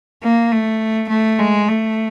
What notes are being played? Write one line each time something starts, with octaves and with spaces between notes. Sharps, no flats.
A#3
A3
A3
G#3
A3